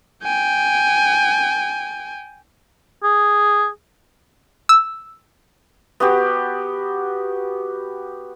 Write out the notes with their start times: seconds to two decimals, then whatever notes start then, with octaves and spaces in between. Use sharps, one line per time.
0.23 G5 G#5
3.04 G#4
4.69 E6
6.00 B3 F#4 G4